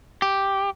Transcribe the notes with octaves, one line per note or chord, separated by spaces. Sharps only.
G4